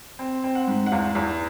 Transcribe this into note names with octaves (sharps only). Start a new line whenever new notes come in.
C4
C4
F#5
G#2
F#5
E2 F5
E2